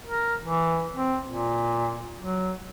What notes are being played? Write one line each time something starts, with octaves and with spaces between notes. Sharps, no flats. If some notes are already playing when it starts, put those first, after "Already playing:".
A#4
E3
C4
A#2
F#3